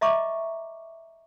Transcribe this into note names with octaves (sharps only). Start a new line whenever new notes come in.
D#5 E5 A#5 B5 C#6 D6